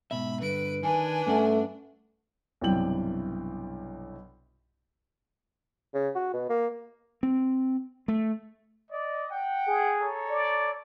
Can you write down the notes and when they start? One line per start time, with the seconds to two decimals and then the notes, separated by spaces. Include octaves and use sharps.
0.11 G#2 B2 E5 B5
0.41 G2 D3 B4 D7
0.83 D#3 D4 B4 G#5
1.27 G2 A3 C#4 F#5
2.61 B1 G2 C3 E3 G5 F#7
5.94 C#3
6.15 F#4
6.33 B2
6.50 A#3
7.23 C4
8.08 A3
8.91 D5 D#5
9.31 F#5 G5
9.68 G#4
10.00 A4 C#5 A#5
10.30 D5